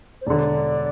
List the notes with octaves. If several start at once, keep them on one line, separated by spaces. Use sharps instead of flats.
C5
E1 D3 D5